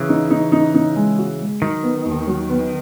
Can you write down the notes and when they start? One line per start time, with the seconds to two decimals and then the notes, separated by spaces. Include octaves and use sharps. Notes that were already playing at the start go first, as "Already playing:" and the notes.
Already playing: C#3 E3
0.09 D#4
0.30 D#4
0.52 D#4
0.74 D#4
0.96 G#3
1.18 F#4
1.41 G#3
1.62 D#3 F#3
1.83 B3
2.05 D#2
2.27 F#3
2.50 B3